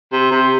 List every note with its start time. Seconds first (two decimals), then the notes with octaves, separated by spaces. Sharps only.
0.12 C3
0.31 C3